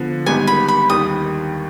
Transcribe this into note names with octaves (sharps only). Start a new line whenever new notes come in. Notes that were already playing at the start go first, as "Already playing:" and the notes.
Already playing: D3 F3 B3
G#1 G#2 G3 B3 G#5
B5
B5
D#2 D#3 G3 D#6